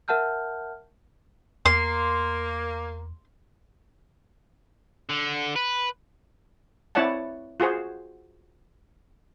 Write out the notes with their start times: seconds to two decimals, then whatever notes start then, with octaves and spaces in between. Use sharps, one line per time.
0.08 A#4 E5 F#5 A5 F6 G6
1.65 E2 A#3 C6
5.09 D3
5.56 B4
6.95 C4 E4 C#5 D5 F#5 A5
7.60 F4 F#4 G#4 C5